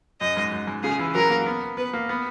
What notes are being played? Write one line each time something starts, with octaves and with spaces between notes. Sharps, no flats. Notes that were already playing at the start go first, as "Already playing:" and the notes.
F#2 D#5
G#2
F#2
G#2
C#3 G#4
E3
F#3 A#4
A#3
B3
B3 B4
A#3
B3